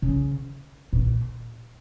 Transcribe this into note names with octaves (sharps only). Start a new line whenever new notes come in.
C#3
A#2